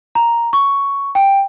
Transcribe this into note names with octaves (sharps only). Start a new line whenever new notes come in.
A#5
C#6
G5